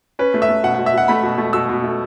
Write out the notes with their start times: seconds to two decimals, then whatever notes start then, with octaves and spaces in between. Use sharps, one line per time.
0.19 C#4 B4
0.34 A3
0.42 E5
0.49 A3
0.64 B2 F#5
0.75 F#5
0.79 B2
0.86 E5
0.94 B2 F#5
1.08 A3 B5
1.23 B2
1.38 A3
1.53 B2 E6
1.69 B2
1.84 A3